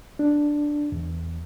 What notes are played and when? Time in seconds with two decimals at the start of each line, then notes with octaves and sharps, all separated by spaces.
0.19 D4
0.92 E2